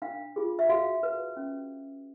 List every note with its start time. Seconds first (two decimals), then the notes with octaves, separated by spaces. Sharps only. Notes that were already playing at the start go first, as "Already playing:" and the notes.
0.02 D4 F5
0.36 F4 G#4
0.59 E5
0.69 F#4 F5
1.03 B4
1.37 C#4